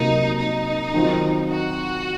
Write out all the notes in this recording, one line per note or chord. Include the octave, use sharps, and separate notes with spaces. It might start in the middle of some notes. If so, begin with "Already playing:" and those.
Already playing: C3 F#3 A#3 D#4
D#4
D#3 F#3 C4 F4
F#4